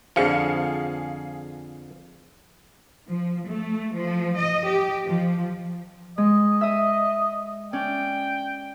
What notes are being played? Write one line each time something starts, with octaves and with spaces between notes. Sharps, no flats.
F2 D3 F3 G#4 F5 C#7
F3
A3
F3
D#5
G4
F3
G#3 D#5
E5 D#6
C#4 D5 G5